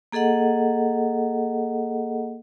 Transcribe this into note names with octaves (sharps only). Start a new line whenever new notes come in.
A#3 G#4 A4 D#5 F#5